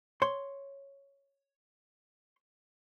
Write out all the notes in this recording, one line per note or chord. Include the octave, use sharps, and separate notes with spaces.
C#5 C6